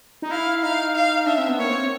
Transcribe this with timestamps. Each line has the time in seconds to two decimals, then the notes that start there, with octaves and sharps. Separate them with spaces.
0.22 D#4
0.31 E4 F5
0.63 D#4 F5
0.95 F5
1.26 D4 E5
1.38 C4
1.48 B3
1.59 A#3 C#5
1.70 C4